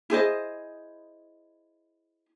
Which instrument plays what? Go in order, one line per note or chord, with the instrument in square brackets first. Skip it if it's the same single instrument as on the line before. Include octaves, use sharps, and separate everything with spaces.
[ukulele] E4 G#4 C5 D#5